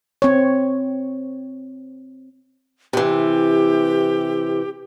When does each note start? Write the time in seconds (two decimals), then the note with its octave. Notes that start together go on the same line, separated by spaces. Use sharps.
0.22 C4 C#5
2.93 C3 E3 G4